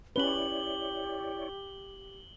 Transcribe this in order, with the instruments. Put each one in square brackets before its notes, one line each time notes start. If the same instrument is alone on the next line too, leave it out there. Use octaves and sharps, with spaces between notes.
[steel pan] C#4 B4 [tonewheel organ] E4 C#5 D5 [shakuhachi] G4 [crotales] F#7 G7